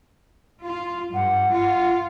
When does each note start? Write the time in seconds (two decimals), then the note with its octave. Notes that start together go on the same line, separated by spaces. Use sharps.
0.63 F4
1.14 G2 F#5
1.50 F4